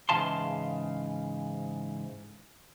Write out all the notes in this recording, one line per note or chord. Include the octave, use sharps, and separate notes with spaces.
G#2 C#3 E3 F5 A5 C6